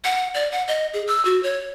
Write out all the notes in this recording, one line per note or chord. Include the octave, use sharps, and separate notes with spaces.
F#5
D5
F#5
D#5
G#4
E6
F#4
C#5